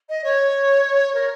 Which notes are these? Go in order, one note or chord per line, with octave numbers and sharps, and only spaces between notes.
D#5
C#5
A#4